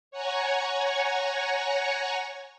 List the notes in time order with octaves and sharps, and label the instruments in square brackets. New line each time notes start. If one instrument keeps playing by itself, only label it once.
[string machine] C#5 F#5 G#5 A#5 C#6